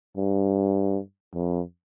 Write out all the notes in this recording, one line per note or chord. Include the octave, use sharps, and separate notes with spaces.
G2
F2